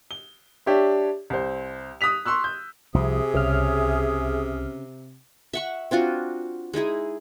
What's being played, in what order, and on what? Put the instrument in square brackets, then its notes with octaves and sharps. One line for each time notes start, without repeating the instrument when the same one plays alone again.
[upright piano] G7
D4 G4 C#5 E5
C2 C5
D#6 F#6 B6 F7
C6 C#6 E6 F#6
G6
[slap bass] C2 F3 [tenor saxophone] C3 [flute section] G#4 E5 D#6
[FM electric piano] C2 F6 [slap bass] C#3
[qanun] E5 F#5 C#6
C4 D4 F4 F#4
G#3 D#4 E4 G#4